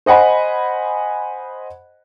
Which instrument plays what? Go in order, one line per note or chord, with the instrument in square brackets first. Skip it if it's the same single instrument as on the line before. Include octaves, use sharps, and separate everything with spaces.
[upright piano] C5 D#5 F#5 G#5 B5